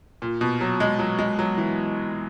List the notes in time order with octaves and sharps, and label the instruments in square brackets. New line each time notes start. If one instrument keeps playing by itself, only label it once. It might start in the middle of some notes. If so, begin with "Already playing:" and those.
[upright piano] A#2
B2
F#3
G#3
F#3
G#3
F#3
E3